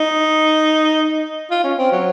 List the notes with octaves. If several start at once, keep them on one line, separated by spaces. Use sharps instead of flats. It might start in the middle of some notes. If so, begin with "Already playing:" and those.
Already playing: D#4
F4
C#4
C4
F#3